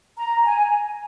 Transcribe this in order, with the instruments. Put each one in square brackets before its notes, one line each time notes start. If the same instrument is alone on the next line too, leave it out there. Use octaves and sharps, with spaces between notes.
[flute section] A#5
G#5